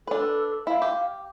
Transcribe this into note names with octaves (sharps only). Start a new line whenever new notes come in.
D4 A4 B4
E4 F5
G4